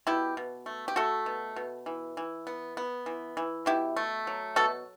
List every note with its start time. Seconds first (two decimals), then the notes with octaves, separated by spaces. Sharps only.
0.07 B2 E4 G4
0.37 B2
0.66 A3
0.88 G4
0.96 A3 F#4 A4
1.26 B2
1.56 B2
1.86 E3
2.17 E3
2.47 B3
2.77 B3
3.06 E3
3.37 E3
3.66 B2 E4 G4
3.96 A3
4.27 F#3
4.56 B2 F#4 A4